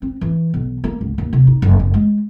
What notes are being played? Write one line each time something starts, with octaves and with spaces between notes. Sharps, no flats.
C4
E3
B1
A#3
C#2
D#2
C3
D#4
F#1
F#1
G#3